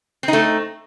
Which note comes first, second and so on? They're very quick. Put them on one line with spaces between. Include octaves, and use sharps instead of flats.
C4 D#4 A3